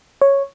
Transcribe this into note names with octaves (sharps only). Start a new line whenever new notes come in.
C#5